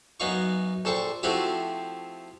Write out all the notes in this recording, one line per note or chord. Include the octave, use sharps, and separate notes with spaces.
F#2 B3 D#4 F5 C#6
A#1 A4 C5 G5 C#6
F3 A3 C4 E4 F#4 G4